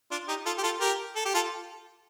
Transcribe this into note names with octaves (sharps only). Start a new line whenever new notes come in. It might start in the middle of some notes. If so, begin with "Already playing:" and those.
D4 F4
D#4 G4
F4 A4
G4
F4 A4
G4 A#4
A4
G4
F4 A4